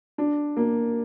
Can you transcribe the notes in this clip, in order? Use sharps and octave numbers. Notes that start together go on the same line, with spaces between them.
D4
A#3